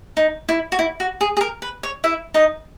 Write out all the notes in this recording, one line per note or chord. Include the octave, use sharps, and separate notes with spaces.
D#4
E4
F#4
E4
F#4
G#4
G#4
A#4
B4
C#5
E4 E5
D#4 D#5